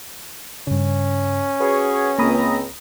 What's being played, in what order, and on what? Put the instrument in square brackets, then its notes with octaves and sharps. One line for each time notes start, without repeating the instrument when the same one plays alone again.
[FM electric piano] G2 C#3 [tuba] C#4
[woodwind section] F#4 G#4 C#5 [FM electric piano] B4
[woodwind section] C#2 C4 A#5 [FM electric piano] A#3 B5 D#6